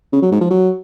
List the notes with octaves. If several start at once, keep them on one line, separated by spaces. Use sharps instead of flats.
C#3
F#3
G#2
F3
F#3